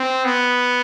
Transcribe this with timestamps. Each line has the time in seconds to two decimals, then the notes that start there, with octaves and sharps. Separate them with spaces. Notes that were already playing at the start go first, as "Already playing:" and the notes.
Already playing: C4
0.25 B3